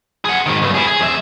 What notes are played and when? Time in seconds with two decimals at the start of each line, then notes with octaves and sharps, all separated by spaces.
0.25 G#4 F#5
0.46 G#2 D#3
0.62 B1 G2
0.75 E4 G#4
0.87 G#4
1.00 F2 E5